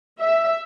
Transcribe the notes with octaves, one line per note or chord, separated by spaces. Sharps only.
E5